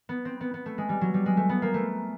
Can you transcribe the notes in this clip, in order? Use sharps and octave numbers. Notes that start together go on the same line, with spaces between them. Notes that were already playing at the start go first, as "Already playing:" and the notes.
B3
C4
B3
B3
A3
G#3
G3
F#3
G3
G#3
A3
B3
A#3
A3